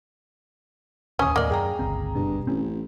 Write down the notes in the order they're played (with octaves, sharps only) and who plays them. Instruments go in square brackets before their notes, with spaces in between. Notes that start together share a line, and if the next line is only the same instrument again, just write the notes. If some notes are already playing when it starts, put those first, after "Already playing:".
[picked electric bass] D1 D#2 [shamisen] C#4 [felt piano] G#5 D#6
[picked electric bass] D#2 A2 [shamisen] A#3 D5 [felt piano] D#5
[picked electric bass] F#2 [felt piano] G#4 G5 A#5
[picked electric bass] G1 C#2 C4
[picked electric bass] F#1 B2 [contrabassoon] G2
[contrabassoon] A1 [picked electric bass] C4 C#4